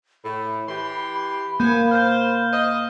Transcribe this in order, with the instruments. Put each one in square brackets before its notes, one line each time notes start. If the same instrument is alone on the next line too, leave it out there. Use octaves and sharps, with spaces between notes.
[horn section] A2 [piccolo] B5
[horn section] E3 G4 C6
[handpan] A#3 [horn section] B3 C5 G#5 [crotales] G6
[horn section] C5 [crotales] F6 G6
[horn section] C5 D#5